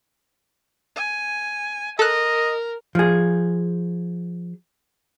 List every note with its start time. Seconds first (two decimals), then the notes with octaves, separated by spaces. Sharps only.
0.96 G#5
1.99 A4 A#4 D#5 F#6
2.95 F3 G#4